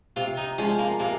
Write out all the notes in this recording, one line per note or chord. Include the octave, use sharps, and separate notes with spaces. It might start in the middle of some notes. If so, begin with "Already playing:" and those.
C3 F4
D#4
F3 G#3 C#4
A#3
C3 A#3